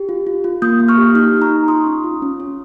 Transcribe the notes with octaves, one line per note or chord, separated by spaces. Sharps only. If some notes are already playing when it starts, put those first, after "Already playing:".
Already playing: G4
F4
F4
F4
A#3 D#6 G6
A#3
C#6 F6
G4
D#4 C#6 F6
D#4
A#5 C#6
D#4
F4 C6 D#6
C#4
F4
C#4
C#4